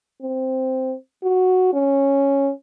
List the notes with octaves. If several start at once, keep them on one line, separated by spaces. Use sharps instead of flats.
C4
F#4
C#4